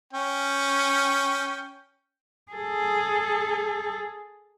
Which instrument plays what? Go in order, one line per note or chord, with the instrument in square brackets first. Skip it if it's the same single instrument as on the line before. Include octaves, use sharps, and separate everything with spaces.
[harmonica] C#4 G5
[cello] G#4 A4